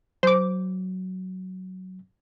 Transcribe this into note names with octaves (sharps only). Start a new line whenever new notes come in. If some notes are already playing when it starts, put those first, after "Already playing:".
F#3 C5 D6